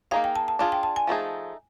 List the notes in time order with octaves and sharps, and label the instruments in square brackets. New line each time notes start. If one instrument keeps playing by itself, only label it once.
[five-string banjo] A#3 D#4 G#4 [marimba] F5
[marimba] G5
A5
A5
[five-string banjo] D4 F4 G#4 [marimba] A5
[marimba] G5
A5
G#5
[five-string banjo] F3 A3 C4 D#4 G#4